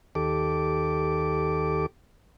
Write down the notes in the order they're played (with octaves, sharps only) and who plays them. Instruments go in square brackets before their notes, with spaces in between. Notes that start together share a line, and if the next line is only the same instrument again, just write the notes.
[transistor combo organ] D#2 G4 A4 D6